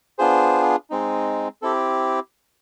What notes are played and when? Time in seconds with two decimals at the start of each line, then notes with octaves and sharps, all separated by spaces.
0.19 B3 D4 F4 G#4 C5
0.90 G#3 C4 D#4
1.62 C4 E4 G4 A4